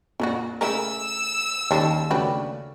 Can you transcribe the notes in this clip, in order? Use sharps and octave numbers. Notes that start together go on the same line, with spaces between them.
A#2 D3 D4 F#4
C#3 A3 E4 A#4 E6
D#2 C#4 D4 A4
C#3 A3 D4 F#4 G4 B4